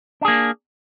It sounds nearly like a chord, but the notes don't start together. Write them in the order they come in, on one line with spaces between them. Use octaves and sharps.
D4 G#4 A#3